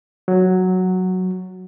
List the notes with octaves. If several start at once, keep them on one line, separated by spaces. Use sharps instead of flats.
F#3